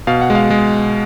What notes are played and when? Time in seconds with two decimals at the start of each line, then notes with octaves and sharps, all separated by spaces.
0.07 B2 F5
0.22 F#5
0.30 G#3
0.35 F5
0.50 G#3